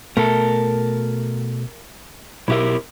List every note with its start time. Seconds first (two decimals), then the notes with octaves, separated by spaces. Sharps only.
0.17 B2 A3 A#4 A5
2.48 B1 B2 E4 G4 A#4 E5